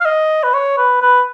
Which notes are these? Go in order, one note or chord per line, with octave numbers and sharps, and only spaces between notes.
F5
D#5
B4
C#5
B4
B4